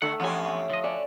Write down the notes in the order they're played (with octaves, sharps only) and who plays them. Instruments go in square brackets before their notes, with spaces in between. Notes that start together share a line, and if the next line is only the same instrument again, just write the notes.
[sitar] D3 [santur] A3 E5 [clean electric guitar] F#5
[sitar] E2 C#4 G4 [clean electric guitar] B3 G#5
[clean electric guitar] D3 D#5 [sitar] F3
[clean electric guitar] D3 F#4 G4 [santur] D5 G#5